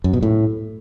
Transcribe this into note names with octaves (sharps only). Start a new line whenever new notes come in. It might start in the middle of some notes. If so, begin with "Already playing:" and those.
F#2
B2
A2